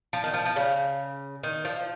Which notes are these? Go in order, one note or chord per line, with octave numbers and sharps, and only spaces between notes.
F3
D#3
F3
F3
C#3
D#3
F3